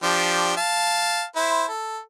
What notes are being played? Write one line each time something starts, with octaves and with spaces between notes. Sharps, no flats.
F3 D4 G4
F5 A5
E4 C5
A4